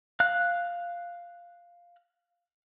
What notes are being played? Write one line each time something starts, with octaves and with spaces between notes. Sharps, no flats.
F5 F#6